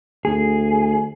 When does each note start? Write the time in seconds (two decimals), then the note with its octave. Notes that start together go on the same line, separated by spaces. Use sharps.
0.25 D2 G#4